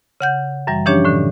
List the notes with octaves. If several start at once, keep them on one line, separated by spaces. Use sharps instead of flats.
C#3 F#5 G6
F#2 E3 G3
E3 F3 C#4 D4 G4 C#5
A2 D3